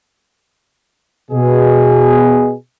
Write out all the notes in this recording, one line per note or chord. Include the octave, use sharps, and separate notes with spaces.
B2 G#4